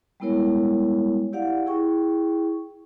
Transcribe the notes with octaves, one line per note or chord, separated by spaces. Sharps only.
G3 G#3 B3 E4 A#4 C#5
E4 G4 D5 F5 F#5
E4 G#4 G5 C#6